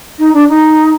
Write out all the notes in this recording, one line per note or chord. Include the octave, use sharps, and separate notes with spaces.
D#4
D4
D#4